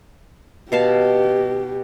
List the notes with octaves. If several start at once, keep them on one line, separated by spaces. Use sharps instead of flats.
B2 G4 F5 A5